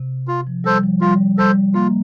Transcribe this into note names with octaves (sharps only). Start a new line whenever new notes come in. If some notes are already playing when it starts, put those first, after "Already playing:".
Already playing: C3
F4
F3
G3 A4 C5
F3
G3 F4
G3 A4 C5
A#3 F4